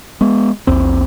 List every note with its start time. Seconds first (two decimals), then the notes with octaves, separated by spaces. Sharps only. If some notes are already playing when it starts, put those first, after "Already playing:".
0.21 G#3 B3
0.67 A#1 E2 C4